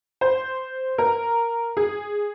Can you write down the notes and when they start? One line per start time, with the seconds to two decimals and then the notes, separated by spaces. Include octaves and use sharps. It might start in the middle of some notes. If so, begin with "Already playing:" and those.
0.21 C5
0.98 A#4
1.77 G#4